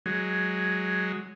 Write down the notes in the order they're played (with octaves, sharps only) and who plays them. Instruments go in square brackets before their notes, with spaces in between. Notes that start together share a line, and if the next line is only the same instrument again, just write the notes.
[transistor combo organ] F#3 G#3